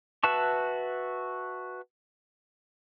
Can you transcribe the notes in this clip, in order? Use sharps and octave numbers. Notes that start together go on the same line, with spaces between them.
F#4 B4 E5 A5 C#6